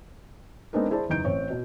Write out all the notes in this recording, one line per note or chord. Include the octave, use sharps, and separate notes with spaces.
G#3 B3 C4 D4 D#4 A#4
E4 G#4 C5 D5 A5
F#1 E2 D#4 G6 D7
A1 C4 C#5
B2